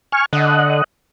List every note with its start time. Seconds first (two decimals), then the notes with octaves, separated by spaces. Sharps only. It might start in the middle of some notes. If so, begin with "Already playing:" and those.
0.12 G#5 C#6 F6
0.33 D3 D#5 F#5